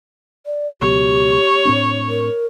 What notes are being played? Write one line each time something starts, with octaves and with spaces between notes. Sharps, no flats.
D5
C#2 B2 F#3 G4 C#5
A2 C4 D4
A#4